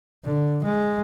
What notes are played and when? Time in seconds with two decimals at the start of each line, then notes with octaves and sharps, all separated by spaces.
0.25 D3
0.64 G#3